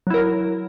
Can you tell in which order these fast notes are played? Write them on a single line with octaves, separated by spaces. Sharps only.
F#3 E4 A#4